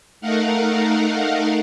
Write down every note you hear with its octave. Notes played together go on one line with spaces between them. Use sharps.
A3 D#4 A#4 F5 F#5